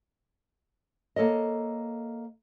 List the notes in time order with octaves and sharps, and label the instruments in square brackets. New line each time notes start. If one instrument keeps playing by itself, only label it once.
[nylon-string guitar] A#3 A4 C#5 D#5